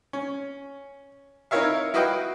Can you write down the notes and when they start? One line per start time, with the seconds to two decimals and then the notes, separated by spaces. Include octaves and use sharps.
0.13 C#4
1.51 D#4 E4 A#4 C#5 E5 F5
1.94 E4 F#4 B4 D#5 F5 G5